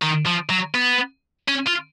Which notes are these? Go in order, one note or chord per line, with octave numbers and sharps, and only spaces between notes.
D#3
F3
F#3
B3
C#4
F4